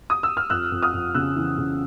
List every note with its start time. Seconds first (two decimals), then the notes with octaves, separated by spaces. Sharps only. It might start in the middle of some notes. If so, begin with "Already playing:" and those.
0.10 D#6
0.23 E6
0.37 F6
0.50 F2 E6 F#6
0.72 F2
0.82 D#6 F6
0.93 F2
1.14 C#3 E6 F#6
1.36 E3
1.58 C#3